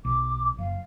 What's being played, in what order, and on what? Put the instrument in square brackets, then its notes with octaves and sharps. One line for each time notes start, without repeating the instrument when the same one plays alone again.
[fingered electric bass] B1 [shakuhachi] D6
[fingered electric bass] F#1 [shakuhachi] F5